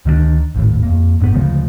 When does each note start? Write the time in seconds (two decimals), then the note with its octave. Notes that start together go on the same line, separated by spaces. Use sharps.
0.05 D2 D#3 F#3 D4
0.54 G#1 D#2 A2
0.83 F2 A#3
1.20 F#1 G#2 C3 B3
1.34 D2 C#3 F3 G#3